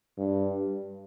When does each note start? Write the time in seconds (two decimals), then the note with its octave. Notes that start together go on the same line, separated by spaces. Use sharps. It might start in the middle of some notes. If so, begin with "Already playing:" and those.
0.18 G2